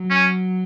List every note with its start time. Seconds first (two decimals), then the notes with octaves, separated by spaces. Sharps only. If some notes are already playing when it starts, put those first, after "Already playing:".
Already playing: F#3
0.10 C#4